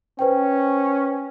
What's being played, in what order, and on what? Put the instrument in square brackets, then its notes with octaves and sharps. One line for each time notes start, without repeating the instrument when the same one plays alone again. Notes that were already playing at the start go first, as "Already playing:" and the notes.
[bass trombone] C#4 [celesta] B4 C5 G5